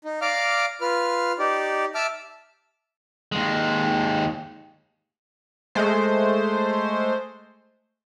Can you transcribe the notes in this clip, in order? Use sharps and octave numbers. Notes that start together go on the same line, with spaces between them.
D#4
D5 F5 A#5 D6 F6
F4 B4 F6
D#4 G4 D5
E5 A5 D6 E6 F6
D#2 G#3
G#3 A3 C5